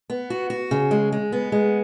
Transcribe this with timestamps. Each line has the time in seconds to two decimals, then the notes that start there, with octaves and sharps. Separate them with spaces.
0.10 B3
0.30 F#4
0.50 F#4
0.71 C#3
0.91 G#3
1.12 G#3
1.32 B3
1.52 G#3